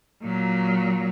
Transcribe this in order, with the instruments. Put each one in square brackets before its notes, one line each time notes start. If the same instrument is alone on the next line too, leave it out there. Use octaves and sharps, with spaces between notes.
[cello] A#2 F#3